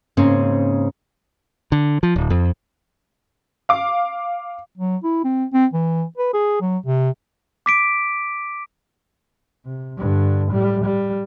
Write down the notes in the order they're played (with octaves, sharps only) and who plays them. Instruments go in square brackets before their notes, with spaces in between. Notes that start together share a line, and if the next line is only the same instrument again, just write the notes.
[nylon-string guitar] G#2 C#3 A#3 C4 C#4
[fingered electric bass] D3
F3
D1
F2
[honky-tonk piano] F5 D6
[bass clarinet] F#3
E4
C4
C4
E3
B4
G#4
F#3
C3
[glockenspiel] D6 B6 D7
[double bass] C3
G2 D3
A2 G3
G3